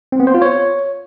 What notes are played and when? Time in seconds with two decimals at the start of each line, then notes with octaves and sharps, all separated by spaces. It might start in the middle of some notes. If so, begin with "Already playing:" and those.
0.12 C4
0.20 B3
0.27 C5
0.34 F4
0.42 C#5